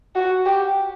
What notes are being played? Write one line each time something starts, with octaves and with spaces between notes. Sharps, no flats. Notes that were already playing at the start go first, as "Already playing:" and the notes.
F#4
G4